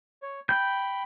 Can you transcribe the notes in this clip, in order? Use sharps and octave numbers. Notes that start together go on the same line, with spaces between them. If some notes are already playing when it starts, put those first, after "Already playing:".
C#5
G5 B5 G6